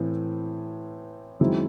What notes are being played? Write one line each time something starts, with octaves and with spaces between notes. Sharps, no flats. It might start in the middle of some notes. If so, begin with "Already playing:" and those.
Already playing: A2 E3 C4
F#2 D#3 G#3 C4 E4